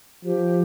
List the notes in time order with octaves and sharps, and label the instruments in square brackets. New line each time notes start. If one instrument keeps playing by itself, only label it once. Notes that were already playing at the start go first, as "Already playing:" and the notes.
[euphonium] F3 [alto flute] G4